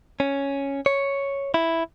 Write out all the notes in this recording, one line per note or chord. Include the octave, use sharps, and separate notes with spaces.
C#4
C#5
E4